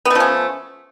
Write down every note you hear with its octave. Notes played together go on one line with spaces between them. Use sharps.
F3 A3 B3 C#4